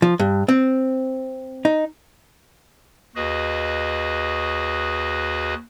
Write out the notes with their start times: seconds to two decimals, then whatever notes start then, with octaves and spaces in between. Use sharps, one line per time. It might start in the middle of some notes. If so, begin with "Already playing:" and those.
0.02 F3
0.19 G2
0.48 C4
1.65 D#4
3.16 D#2 F#4 G#4 B4 D#5